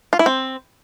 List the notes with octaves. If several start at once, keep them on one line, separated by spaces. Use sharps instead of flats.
F4
E4
C4